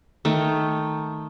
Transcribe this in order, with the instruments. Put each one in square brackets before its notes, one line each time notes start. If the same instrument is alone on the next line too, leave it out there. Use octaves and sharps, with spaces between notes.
[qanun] D#3 A3 D#4